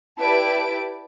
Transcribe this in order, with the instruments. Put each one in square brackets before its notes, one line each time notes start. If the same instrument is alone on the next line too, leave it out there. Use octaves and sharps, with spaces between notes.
[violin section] E4 G4 B4 D5 A5 D7